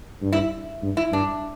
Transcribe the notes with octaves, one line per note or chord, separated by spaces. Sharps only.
G2
E4
G2
E4
G2 D4